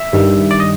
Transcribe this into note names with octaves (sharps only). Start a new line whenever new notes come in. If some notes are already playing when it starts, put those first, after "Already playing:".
Already playing: E5
G2 D#3 G3
D5
D#5